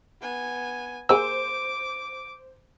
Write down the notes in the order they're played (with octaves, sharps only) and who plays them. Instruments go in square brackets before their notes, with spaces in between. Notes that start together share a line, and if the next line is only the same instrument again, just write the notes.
[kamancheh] B3 G#5
[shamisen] A#3 G#4 [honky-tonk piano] C5 [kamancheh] D6 [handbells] E6